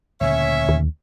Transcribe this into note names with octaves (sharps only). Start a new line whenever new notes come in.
D2 A#2 C#3 C#4 C#5 E5
D#2